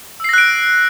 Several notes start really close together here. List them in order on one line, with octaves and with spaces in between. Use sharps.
E6 C7 A#6 F#6 D7